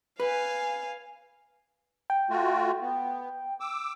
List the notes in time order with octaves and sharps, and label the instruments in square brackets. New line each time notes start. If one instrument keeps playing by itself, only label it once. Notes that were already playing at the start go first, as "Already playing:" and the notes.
[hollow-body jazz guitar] B4 [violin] F5 G#5
[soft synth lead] G5
[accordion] A3 F4 F#4
B3
D6 E6